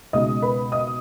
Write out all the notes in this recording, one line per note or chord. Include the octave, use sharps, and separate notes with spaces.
C#2 B2 G#3 D#4 D#5 D#6
B4 B5
D#5 D#6